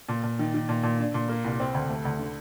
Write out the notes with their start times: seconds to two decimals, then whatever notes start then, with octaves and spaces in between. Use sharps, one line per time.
0.09 A#2
0.23 A#2
0.39 D#3
0.54 D#3
0.69 A#2
0.83 A#2
0.99 D4
1.14 A#2
1.28 A#3
1.44 C2
1.60 C4
1.74 D2
1.89 A3
2.05 D2
2.19 D3